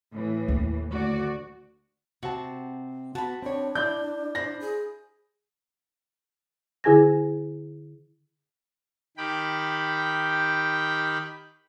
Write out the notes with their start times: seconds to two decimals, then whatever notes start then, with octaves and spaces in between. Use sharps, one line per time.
0.12 A2 E3
0.48 D#2
0.89 D2 F#4 D5
2.23 C3 C4 F#4 A5
3.15 B3 F#4 A5 B5
3.42 C4 D4 C#5
3.75 E4 D5 G6
4.35 C5 B5 A#6
4.60 G#4
6.84 D3 E4 G#4 G#5 G#6 A#6
9.17 D#3 G4 G5 B5